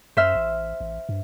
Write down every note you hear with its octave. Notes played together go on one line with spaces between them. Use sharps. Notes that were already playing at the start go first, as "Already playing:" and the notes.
F#2 C5 E5 F6
A1
A1
G2